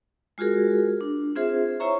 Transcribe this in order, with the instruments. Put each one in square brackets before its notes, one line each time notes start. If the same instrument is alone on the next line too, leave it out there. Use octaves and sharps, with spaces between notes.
[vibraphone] G#3 F4 F#4 G#4 A#4
D4
C4 F4 G#4 C5 E5
E4 C5 C#5 E5 A#5 C#6